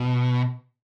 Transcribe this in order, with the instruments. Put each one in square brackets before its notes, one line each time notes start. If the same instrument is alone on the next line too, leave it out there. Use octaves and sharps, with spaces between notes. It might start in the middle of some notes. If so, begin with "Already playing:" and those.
Already playing: [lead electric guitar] B2